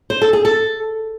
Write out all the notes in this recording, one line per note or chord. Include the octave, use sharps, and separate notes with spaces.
C5
A4
G#4
A4